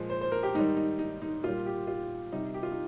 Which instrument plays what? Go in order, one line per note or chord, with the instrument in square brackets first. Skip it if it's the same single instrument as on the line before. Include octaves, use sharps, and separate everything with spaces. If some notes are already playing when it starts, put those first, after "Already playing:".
Already playing: [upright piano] A#2 F3 G#3
C5
C5
A#4
G4
G#2 D#3 G3 D#4
D#4
D#4
D#4
A#2 G3 F4
G4
F4
C3 G3 D#4
G4
F4
D#4